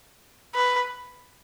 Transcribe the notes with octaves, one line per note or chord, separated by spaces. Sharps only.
B4